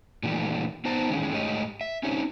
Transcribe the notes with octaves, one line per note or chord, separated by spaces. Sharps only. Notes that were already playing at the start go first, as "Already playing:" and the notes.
A#2 D#3 E3 G3 A3
B3 D#4 C5 A5 A#5
D#3 E3 G#3 C#4
G#2 A3 G4 C#5 D#5
E5
C4 C#4 D#4 G4 C#5